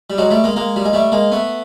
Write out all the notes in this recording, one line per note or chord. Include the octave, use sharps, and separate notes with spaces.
G3
F#3 G#3
G3 A3
G#3 A#3
G#3 A#3
G3
G#3
G3 A3
G#3 A#3
A3 B3